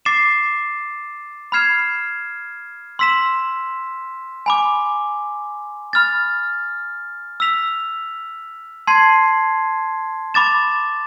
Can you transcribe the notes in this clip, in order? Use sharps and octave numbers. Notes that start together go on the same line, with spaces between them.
D6 A6 C7 E7
B5 F6 G#6 C7 E7
C6 E6 B6 E7
G#5 B5 D6
B5 F6 A6
E6 B6 F7
A5 C6 G#6 C7
B5 D6 A6 E7